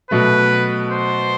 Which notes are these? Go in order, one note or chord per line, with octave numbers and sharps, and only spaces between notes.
B2 F#3 A3 B4
C5